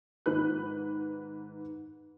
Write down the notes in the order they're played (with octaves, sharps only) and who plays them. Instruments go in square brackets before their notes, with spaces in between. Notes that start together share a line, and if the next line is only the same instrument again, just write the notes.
[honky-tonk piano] G#2 D#3 B4 F#6